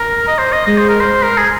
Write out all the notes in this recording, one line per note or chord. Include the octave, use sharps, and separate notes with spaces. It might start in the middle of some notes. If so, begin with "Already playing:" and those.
Already playing: A#4
D#5
C5
D#5
G#3 D#5
C5
A#4
C5
A#4
G#4